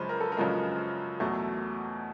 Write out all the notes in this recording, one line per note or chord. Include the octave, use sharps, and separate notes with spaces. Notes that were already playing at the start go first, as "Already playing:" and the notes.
Already playing: F#2 C#3 F3 G#3 B4 C5
A#4
A4
A#4
F#2 C#3 F3 G#3
E2 B2 F#3 A3